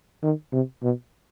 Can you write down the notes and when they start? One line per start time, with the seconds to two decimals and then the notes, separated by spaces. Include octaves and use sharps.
0.23 D#3
0.52 C3
0.83 B2